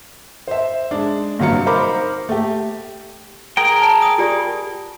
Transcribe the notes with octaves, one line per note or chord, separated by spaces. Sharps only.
C5 E5
G#3 D4
G2 C3 F#3 F5 C#7
D#4 A#4 C5 B5 D6
A3 G4
G#4 A#4 G5
A5
D#6
F4 G4 D5